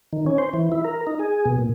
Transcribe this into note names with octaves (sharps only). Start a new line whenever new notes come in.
D#3
C#4
C5
E3
E4
A#4
D#4
G#4
B2
A#2